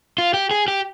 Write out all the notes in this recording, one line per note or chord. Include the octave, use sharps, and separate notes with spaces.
F4
G4
G#4
G4